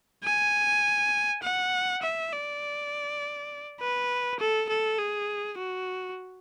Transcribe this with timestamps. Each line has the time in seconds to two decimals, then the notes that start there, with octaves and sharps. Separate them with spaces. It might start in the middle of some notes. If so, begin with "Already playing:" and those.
0.24 G#5
1.43 F#5
2.02 E5
2.32 D5
3.80 B4
4.40 A4
4.69 A4
4.99 G#4
5.58 F#4